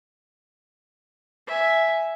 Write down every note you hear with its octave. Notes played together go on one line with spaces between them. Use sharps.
E5 G#5